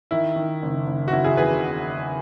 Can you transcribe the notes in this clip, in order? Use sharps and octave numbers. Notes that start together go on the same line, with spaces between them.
D#3 E4
D#3
F#1
F#1
F#4
F#1 E4
E4 G#4
E2 G#4 B4